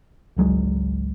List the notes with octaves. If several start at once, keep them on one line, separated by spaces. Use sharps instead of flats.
G#1 C#2 F#3 G#3